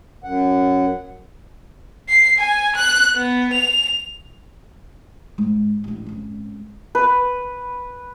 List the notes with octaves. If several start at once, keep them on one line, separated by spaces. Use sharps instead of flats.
F#2 F#5
C7
G#5
F#6
B3
F7
G#2
A1 D4
G#1 C#4
B4